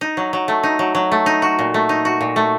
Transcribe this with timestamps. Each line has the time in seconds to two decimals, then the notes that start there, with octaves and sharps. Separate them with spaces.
0.01 D#4
0.17 F#3
0.33 F#3
0.48 A3
0.63 D#4
0.79 F#3
0.95 F#3
1.12 A3
1.26 D#4
1.42 F#4
1.59 A#2
1.74 A3
1.89 D#4
2.05 F#4
2.21 A#2
2.36 A3